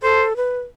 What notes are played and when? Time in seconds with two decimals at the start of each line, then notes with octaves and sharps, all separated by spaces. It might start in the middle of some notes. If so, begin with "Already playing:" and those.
0.03 A4 C5
0.36 B4